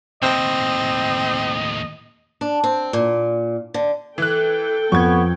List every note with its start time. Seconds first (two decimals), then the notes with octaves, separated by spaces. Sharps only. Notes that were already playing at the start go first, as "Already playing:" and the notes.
0.22 D#2 A2 C4 D#5
2.41 D4
2.64 C4
2.93 A#2
3.74 D3
4.18 E3 A4 G5 F#6
4.92 F2 B3 C#6 G#6